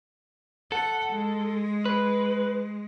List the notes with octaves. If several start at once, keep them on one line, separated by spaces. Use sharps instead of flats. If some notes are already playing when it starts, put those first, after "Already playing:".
A4 F#5
G#3
B4